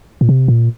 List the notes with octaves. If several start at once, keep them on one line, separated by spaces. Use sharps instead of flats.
A#2
C3
A#2